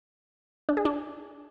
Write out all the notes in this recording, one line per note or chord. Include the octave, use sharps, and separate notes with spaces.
D4
G#4
D4